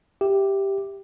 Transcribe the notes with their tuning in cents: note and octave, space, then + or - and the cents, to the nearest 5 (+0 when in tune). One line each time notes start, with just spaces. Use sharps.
G4 +0 E5 +0